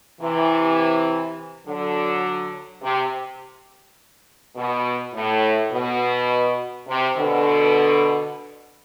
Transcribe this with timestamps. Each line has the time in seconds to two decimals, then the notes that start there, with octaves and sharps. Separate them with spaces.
0.21 C3 E3
1.67 D3 F#3
2.83 C3
4.56 B2
5.14 A2
5.72 B2
6.88 C3
7.17 B2 D3